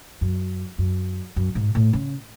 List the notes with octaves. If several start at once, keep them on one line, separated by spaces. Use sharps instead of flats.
F#2
F#2
F#2
G#2
A2
C#3